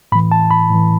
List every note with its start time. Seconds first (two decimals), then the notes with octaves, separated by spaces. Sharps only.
0.12 A2 B5
0.15 E3
0.32 A5
0.51 B5
0.71 A2 E3